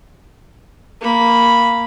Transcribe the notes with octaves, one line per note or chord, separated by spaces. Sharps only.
A#3 B5